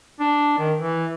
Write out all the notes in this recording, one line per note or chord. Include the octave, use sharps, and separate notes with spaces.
D4
D#3
E3